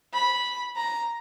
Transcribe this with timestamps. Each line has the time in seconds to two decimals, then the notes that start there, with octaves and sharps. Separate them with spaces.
0.13 B5
0.76 A#5